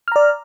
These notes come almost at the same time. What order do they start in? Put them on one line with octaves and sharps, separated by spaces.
F6 A#5 D5